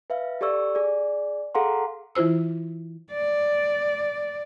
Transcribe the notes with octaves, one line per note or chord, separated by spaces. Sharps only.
B4 E5 F5
G4 A4 D5 C#6 E6
G#4 D5
G#4 A4 F5 F#5 A#5 C6
E3 E4 F4 C5 E6
D5